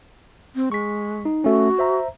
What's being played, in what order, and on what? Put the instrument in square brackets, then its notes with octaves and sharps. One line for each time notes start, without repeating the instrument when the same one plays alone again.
[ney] C4
[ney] G#3 [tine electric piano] C#6 B6
[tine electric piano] D#4
[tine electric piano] A3 C#4 [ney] F#4
[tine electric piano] C5 E5 A#5